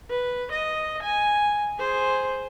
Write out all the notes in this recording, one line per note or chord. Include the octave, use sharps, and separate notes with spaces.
B4
D#5
G#5
G#4 C5